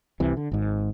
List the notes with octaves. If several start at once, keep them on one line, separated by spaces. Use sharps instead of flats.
F1 C2 C3 E3
D3
G#1 G#2